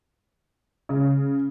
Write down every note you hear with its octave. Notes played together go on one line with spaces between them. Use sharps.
C#3